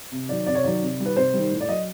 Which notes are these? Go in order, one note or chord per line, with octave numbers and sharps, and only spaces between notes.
C3
D#3 F#3 D5
C3 D5
C#5
D#3 F#3 D5
C3
D#3 G3
B4
C3 C5
D#3 G3
A2
D5
F#3 D#5